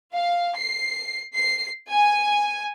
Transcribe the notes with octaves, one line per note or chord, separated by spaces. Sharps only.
F5
C7
C7
G#5